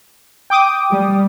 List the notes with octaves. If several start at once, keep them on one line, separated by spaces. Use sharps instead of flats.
G5 D6 D#6
G3